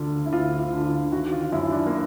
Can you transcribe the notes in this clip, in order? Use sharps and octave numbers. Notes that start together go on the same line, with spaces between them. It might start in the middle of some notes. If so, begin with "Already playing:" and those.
Already playing: D2 D3 F4
E4
D2 F4
F4
D3
F4
D#3 F#4
F4
F#2 E4
D4
A#3